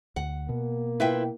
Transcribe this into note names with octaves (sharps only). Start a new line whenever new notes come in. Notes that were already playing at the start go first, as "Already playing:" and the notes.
D2 F#5
B2 A#3
E4 F4 B4 E5 G5